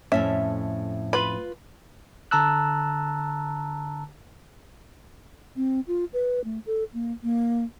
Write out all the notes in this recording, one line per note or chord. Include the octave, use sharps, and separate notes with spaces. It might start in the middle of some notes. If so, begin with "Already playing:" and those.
F2 A2 C#4 E5
F4 B4 B5
D3 A5 A#5 E6 F#6
C4
F4
B4
A3
A4
A#3
A#3